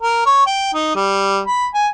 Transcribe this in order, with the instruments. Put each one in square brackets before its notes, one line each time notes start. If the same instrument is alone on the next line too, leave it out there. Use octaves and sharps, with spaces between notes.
[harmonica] A#4
C#5
G5
D#4
G3
B5
G#5